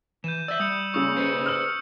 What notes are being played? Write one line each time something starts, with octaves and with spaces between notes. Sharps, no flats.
E3 G6 D#7 E7
D5 E5 E6 G6
G3 D#6 G6 C#7
D#2 C#3 C#6 D#6 E6
G#4 B4 C5 C#7
F6 F#7